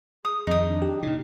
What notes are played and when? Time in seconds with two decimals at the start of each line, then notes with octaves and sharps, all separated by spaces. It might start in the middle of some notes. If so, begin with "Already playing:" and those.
0.25 G#4 D#6
0.47 F2 D#3 D#4 D#6
0.67 D4
0.82 G4
1.03 A#2 C#3 D#4